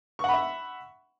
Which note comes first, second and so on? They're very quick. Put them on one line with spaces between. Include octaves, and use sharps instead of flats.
C#6 F#5 B5 E5